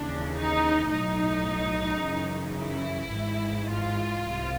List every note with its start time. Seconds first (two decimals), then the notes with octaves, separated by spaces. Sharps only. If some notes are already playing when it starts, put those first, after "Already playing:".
Already playing: D#2 C#3 E3 D4
0.36 D#4
0.92 B1 A2 F#3 D#4
2.03 F#2 C#3 E3
2.58 E4
3.14 G#1 G#2 E3
3.70 F4
4.25 C2 C3